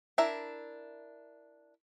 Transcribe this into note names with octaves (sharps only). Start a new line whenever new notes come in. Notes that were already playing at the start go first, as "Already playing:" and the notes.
D4 E4 A#4 E5